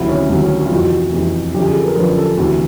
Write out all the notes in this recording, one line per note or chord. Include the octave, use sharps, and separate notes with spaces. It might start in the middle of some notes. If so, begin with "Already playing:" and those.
Already playing: D2 C3 D#3 F#3 E4
C#4
D2 C3 D#3 F#3
C#4
F#4
F4
F2 C3 E3 F#4
F2 C3 E3
F#2 D3 F3 G4
G#4
A4
A#4
F#2 D3 F3 B4
A4
D2 C3 E3 F#4